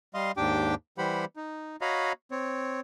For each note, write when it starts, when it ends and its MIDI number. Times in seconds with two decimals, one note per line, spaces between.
0.14 0.32 55
0.14 0.32 75
0.14 0.32 77
0.14 0.32 84
0.37 0.75 39
0.37 0.75 44
0.37 0.75 62
0.37 0.75 67
0.37 0.75 79
0.37 0.75 86
0.98 1.25 52
0.98 1.25 55
0.98 1.25 67
0.98 1.25 72
0.98 1.25 78
0.98 1.25 83
1.36 1.76 63
1.81 2.12 66
1.81 2.12 73
1.81 2.12 75
1.81 2.12 77
1.81 2.12 82
1.81 2.12 83
2.31 2.80 60
2.31 2.80 73